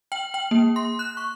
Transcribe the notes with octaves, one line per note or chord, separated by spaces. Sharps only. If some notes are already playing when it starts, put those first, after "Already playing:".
G5
G5
A#3
C6
F#6
C#6